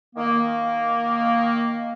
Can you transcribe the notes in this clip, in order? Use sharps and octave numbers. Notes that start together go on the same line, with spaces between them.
D#3 A#3